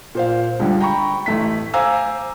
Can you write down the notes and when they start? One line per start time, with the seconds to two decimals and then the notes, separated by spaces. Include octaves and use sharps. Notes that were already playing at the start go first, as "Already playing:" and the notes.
0.15 A#2 C5 F5
0.59 C#2 D3 G3 F4
0.80 G5 A#5 B5 C#6
1.26 A1 A3 B6
1.74 C5 F5 G#5 A#5 D6 E6